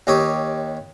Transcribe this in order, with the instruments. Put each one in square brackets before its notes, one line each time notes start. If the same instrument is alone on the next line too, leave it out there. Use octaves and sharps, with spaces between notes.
[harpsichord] D#2 D#4 G4 C#5